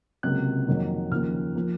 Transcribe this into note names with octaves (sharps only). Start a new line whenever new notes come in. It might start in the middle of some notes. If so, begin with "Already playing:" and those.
C#2 C3 F#3 A#3 F#6
F2 D#3 F#3 A#3
D#2 C#3 F3 A#3 F6
F3 A#3